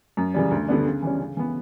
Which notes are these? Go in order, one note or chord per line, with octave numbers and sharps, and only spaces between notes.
F#2
C#3 E3 G3
D2
D3 G3 B3 D4
C#3
E3 G3 C#4
C#3
E3 B3